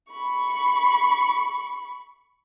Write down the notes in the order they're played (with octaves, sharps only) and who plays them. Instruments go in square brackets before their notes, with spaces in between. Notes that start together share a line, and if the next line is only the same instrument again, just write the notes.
[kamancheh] B5 C#6